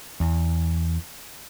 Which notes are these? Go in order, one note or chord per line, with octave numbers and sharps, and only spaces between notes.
E2